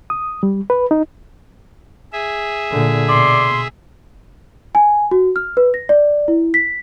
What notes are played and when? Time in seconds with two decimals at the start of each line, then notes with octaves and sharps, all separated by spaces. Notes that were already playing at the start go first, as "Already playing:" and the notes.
0.10 D#6
0.43 G3
0.70 B4
0.91 D#4
2.13 G#4 E5
2.71 A#2 D3
3.09 B2 D5 C6
4.75 G#5
5.11 F#4
5.36 F6
5.57 B4
5.74 A#6
5.89 D5
6.28 E4
6.54 B6